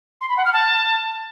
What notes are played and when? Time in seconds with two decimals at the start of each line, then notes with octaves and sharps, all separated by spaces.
0.21 C6
0.29 B5
0.37 F#5
0.45 F6
0.53 A5